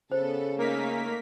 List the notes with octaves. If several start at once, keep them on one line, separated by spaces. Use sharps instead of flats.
C#3 B3 A4 C5
A3 A#3 C#4 D#4 A#4 B6